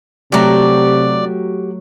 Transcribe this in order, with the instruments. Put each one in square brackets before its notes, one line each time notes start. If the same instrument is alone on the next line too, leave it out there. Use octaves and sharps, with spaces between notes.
[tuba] C3 [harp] F#3 A3 A#5 [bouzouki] F#4 G4 [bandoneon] D5